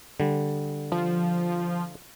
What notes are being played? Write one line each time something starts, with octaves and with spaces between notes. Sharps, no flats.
D3 G3
F3